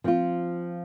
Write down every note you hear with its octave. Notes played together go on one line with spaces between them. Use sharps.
F3 C4 F4